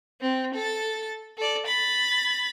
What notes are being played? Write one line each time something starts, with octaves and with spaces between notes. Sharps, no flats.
C4
A4 A6
A4 D5
B5 A6